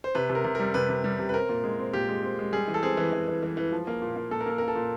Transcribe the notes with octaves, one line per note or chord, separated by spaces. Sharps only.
C5
C3 B4
C3
A#4
C3
G3 A#4
C3 B4
C3
G3
C3
B4
C4 A#4
A#2
G#3
C4
A#2 G4
G#3
C4
G#3
G3 G#4
E3
A4
C4 G#4
E3
E3
E3
E3
E3
F3
A#3
A#2
A#3
A#2 A4
A#4
A#3 A4
A#3 A#4
A4
A#2